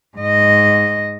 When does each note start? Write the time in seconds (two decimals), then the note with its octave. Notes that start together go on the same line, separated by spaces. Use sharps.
0.17 G#2 D#5